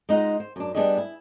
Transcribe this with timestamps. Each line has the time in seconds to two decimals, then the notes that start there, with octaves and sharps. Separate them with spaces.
0.09 G#3 D#4 F4 F#5
0.40 C5
0.56 F#2 D4
0.75 G3 B3 D4 F4 G#4 D#5
0.98 E4